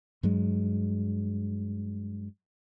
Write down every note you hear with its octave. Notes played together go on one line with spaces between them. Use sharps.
G2 F#3 G#3